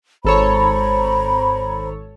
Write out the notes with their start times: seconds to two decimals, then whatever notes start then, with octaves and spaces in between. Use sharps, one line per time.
0.25 G#1 A4 C5 C#5 A#5 B5